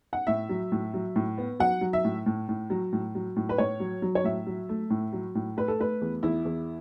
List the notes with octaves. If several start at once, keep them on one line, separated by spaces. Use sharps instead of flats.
F#5
A2 E5
F#3
A2
F#3
A2
B3
F#3 F#5
F#3
E5
A2
A2
A2
F#3
A2
F#3
A2
B4
A2 C#5
F#3
F#3
C#5
A2 E5
F#3
A3
A2
F#3
A2
A3 B4
A4
A3 B4
E2
E2 E4
E2